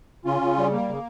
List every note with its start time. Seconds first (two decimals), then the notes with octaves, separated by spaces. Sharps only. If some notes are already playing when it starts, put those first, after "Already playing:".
0.25 C#3 C#4 F4
0.41 C#3
0.57 G3
0.72 A#3
0.89 C#3